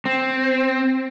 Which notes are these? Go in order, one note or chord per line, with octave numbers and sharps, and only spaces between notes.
C4